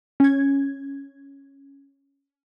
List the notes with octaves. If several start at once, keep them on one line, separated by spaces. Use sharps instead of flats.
C#4 G#6